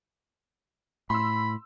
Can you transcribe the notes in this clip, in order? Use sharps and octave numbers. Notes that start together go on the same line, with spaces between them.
A2 B5 C6 E6